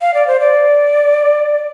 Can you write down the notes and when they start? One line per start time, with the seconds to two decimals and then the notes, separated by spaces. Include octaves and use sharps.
0.01 F5
0.14 D5
0.27 C5
0.40 D5